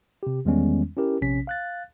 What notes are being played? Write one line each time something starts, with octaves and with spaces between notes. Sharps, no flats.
C3 G4
E2 D#3 G3 G#3 B3 C#4
C#4 E4 G4 A#4
A#1 C3 C#4 B6
F5 F#6 A6